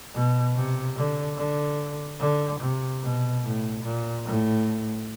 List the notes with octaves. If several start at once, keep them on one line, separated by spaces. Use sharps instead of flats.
B2
C3
D3
D3
D3
C3
B2
A2
A#2
A2